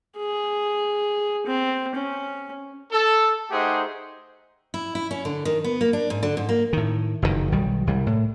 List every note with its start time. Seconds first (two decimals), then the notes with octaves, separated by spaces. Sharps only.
0.18 G#4
1.46 C4
1.95 C#4
2.91 A4
3.51 A3 D#4 G4 G#4 C5 F#5
4.74 E4
4.95 E4
5.11 C#4
5.25 D3
5.45 D#3
5.64 B3
5.81 A#3
5.93 D4
6.10 G#2
6.23 D3
6.37 G#2
6.49 A#3
6.73 A2 D#3
7.22 F#1 F2 G#2 D#3
7.52 B1 D#3 F#3 G3
7.87 C2 G3
8.07 A2